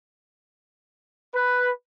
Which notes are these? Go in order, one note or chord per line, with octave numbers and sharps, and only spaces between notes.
B4